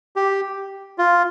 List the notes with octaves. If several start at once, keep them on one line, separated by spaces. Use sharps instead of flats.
G4
F4